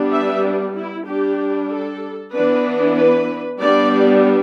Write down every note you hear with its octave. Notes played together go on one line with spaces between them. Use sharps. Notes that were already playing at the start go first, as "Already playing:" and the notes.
Already playing: G3 B3 D4
E5
D4
E4
G3 D4 G4
A4
E3 B3 D4 B4
B4
G3 B3 D4 D5